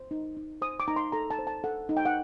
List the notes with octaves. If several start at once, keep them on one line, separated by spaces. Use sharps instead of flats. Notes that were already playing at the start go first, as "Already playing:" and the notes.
Already playing: C5
D#4
D#4
C5 D#6
D6
D#4 A#5
C6
A4 A#5
A5
C5
A5
A4 F#5
D#4
G5
F#5